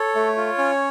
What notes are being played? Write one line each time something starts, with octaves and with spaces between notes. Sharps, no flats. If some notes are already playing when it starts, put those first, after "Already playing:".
Already playing: A4 C#5
A3
F4
C#4